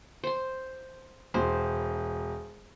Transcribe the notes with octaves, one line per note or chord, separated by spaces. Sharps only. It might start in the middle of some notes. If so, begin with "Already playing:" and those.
C5 C6
E1 C5